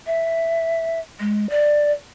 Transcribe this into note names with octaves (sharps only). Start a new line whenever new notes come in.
E5
G#3
D5